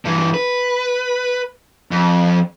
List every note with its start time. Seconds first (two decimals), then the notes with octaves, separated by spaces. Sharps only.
0.05 G2 E3
0.34 B4
1.91 F2